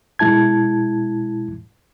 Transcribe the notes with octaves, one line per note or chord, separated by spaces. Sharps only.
B2 G#3 E4 A5 G#6